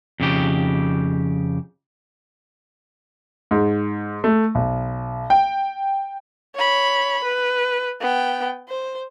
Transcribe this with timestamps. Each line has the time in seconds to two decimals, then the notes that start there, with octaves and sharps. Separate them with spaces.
0.20 F2 C#3 G4
3.51 G#2
4.24 A3
4.55 B1
5.30 G5
6.55 C#5 B5
7.24 B4
8.00 B3 G5
8.69 C5